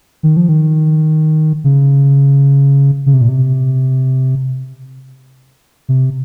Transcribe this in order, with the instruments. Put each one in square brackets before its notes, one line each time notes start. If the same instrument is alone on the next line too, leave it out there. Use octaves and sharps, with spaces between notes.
[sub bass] D#3
F3
D#3
C#3
C#3
C3
A#2
C3
C3